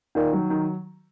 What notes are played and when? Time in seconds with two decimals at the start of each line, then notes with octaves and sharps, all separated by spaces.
0.15 A#2 D#3
0.33 F#3
0.50 D#3